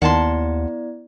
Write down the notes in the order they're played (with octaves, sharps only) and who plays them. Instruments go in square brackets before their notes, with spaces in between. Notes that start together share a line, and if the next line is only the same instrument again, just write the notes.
[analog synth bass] D#2 [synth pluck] D#3 [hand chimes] B3 E4 D5 [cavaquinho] F#5 A5 C6